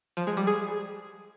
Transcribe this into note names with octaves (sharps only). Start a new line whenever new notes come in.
F3
G#3
G3
G#4